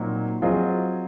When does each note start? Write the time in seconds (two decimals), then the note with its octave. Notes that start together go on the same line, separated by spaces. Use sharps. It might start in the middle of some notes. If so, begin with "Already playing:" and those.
Already playing: A#2 F#3 C4 D#4
0.42 F#3 C4 F4 G#4 D#5